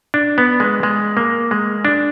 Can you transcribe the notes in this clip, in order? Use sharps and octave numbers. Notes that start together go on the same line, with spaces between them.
D4
B3
G#3
G#3
A#3
G#3
D4